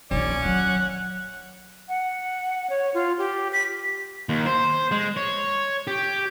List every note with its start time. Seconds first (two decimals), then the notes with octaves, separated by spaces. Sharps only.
0.11 A#1 D#3 C#4 D5
0.45 F#3 F#5
1.89 F#5
2.70 C#5
2.94 F4
3.18 G4
3.53 B6
4.29 D#2
4.46 C5
4.91 G#3
5.17 C#5
5.87 G4